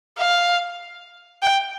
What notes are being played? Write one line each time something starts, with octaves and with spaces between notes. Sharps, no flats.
F5
G5